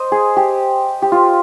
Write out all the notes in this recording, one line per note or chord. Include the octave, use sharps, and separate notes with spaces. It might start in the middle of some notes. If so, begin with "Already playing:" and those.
Already playing: C5 D#5
G#4
G4
G4
F4